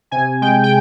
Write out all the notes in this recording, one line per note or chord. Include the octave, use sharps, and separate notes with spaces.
C3 G#5
G#3 G5
G5